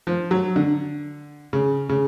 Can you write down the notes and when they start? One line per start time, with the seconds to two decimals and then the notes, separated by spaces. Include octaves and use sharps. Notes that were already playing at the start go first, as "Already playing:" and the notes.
0.07 F3
0.31 F#3
0.56 D3
1.53 C#3
1.89 C#3